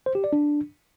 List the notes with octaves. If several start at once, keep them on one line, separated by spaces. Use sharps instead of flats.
C5
G4
D5
D4